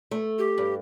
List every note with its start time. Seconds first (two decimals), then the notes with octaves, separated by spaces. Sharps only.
0.11 A3
0.39 G4
0.58 G2